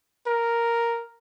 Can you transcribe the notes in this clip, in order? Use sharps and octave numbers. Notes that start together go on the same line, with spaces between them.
A#4